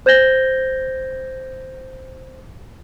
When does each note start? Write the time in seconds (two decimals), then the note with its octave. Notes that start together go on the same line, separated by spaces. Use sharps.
0.06 C5 G6 G#6 A#6 G7